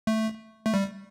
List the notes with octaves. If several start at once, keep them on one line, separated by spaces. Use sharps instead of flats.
A3
A3
G3